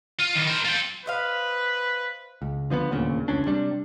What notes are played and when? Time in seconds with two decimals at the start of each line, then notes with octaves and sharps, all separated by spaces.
0.20 F4
0.35 D#3 E3
0.48 A#4 C5
0.65 F4 G5
1.06 B4 C5 D#5 F5
2.42 C#2
2.70 D3 F3 A#3 B3
2.91 D#1 D2 A#2 C#3
3.28 F1 C#2 C#4 D4
3.46 C3 G3 D4